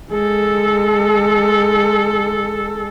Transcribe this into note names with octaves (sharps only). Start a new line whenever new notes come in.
G#3 A4